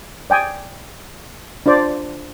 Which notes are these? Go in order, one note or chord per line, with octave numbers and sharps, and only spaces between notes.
D5 G5 G#5 D#6
D4 F4 C5 D5